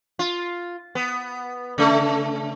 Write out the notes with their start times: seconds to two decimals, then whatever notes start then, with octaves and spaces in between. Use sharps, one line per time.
0.19 F4
0.95 B3
1.78 C#3 A3